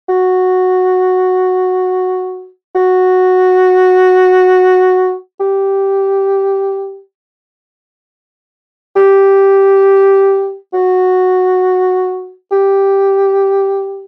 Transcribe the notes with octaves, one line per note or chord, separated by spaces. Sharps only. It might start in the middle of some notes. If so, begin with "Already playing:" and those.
F#4
F#4
G4
G4
F#4
G4